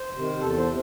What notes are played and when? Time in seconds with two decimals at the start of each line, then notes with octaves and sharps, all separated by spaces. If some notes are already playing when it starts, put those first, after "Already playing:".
Already playing: C5
0.15 C3 D#3
0.41 E2 A4
0.58 C5
0.66 C3